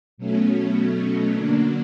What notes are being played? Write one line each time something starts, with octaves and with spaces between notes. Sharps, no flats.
B2 F#3 A3 C#4
D3 F#3 A#3 D4